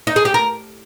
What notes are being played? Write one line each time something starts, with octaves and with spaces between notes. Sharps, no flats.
D#4
G#4
G4
A#4